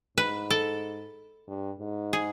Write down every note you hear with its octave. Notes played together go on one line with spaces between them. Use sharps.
G#2 B4
A4
G2
G#2
G#4